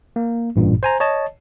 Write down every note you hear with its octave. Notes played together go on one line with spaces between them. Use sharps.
A#3
A1 G2 A#2
C5 G#5 A#5
C#5 D#5 A5